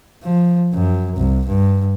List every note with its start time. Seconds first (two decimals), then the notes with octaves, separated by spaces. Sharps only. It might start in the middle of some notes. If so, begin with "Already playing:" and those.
0.23 F3
0.73 F#2
1.16 C2
1.48 G2